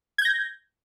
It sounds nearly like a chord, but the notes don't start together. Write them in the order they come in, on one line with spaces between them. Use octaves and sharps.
G#6 G6 A#6